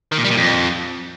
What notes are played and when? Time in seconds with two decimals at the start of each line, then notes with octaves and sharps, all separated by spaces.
0.12 D#3
0.18 A#2
0.24 G3
0.31 A#2
0.37 F2